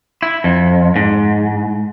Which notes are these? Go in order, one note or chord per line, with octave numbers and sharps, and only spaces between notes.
E4
F2
G#2